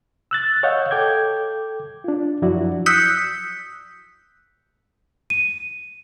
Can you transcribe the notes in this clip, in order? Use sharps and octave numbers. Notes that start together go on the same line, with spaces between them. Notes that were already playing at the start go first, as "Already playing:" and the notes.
E6 F#6 A6
C#5 D#5 F5 F#5 G6
A4 G5 D6 G6 G#6
D4 F4
F#2 F3 F#3 E4 F#4 D5
D#6 E6 F#6 G6 B6 C#7
D#7